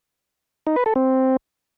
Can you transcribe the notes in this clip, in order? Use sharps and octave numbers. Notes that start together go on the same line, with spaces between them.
D#4
B4
A4
C4